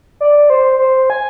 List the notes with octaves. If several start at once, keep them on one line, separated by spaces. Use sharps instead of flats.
D5
C5
C5
G#5